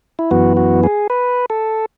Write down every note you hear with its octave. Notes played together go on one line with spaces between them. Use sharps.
E4
F#2 E3 B3 F#4
F#4
G#4
B4
A4